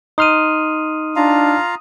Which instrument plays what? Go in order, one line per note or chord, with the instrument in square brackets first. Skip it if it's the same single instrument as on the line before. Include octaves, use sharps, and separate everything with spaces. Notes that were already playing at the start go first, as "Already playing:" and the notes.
[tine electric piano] D#4 C6 F6 [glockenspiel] D#6 D#7
[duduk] D4 [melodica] F4 F5 A#5